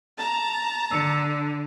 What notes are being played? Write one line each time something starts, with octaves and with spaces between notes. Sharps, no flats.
A5 A#5
D3 E6 C#7